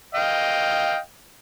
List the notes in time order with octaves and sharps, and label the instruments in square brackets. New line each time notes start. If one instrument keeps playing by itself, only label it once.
[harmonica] D#5 F5 G5